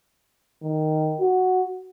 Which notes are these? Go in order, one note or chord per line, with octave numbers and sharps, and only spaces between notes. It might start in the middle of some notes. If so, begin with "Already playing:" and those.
D#3
F#4